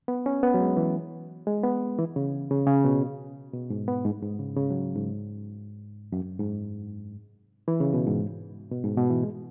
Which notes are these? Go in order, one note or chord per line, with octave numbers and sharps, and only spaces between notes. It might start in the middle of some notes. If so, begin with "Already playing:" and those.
B3
C#4
B3
F#3
G#3
E3
G#3
B3
E3
C#3
C#3
C#3
B2
B2
G#2
B3
G#2
G#2
C#3
C#3
F#3
G#2
F#2
G#2
E3
C#3
B2
G#2
B2
G#2
B2
E3
G#3